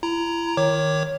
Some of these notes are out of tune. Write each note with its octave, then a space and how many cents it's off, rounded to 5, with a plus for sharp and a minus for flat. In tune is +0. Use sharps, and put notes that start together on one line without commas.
E4 +35 A#5 +0
D#3 +0 C#5 +0 D6 +0